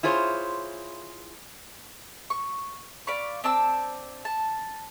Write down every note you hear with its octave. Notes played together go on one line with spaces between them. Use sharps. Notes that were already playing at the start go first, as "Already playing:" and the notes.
E4 F4 G#4 C5 C#5
C#6
D5 F5 B5 C#6
C4 D4 A5 E6
A5